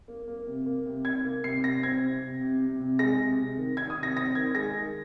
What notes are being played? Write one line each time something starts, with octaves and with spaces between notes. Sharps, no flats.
A#3
A#3
C3
A#3
C3
C3 G#6
A#3
C3 C7
C3 A#6
C4 G#6
C3
C3
C3
C3
C3
G#3 A#6
C3
C3
D#3
D#3 G#6
D#6
C3
A#6
C4 A#6
D#3 G#6
G#3 A#6
D#3